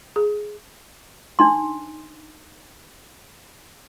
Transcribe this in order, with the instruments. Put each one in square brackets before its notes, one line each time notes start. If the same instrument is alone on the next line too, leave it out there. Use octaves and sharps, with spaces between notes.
[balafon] G#4
[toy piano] D4 D#4 C6